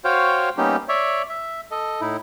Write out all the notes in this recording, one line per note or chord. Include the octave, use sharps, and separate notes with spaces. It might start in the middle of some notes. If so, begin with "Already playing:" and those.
F#4 C5 C#5 F5 G5
G3 A#3 B3 C#4 D#4 G4
C#5 D5 E5
E5
A4 D#5
A2 D#4 E4